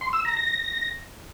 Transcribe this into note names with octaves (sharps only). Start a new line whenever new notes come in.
C6
E6
A#5
A#6